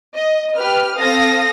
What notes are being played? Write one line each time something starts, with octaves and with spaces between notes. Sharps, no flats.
D#5
G4 B4 F6
C4 A4 F5 D#6 A#6